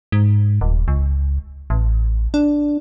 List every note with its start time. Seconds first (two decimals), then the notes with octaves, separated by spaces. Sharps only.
0.12 G#2
0.61 D#1
0.88 C#2
1.70 A1
2.34 D4